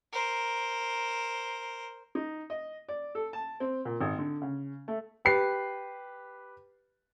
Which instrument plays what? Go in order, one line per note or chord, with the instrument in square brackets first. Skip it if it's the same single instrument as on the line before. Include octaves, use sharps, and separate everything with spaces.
[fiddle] A#4 C5
[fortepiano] D#4
D#5
D5
A4
A5
C4
A#2
G#1
D3
C#3
A3
[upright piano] G4 B4 C7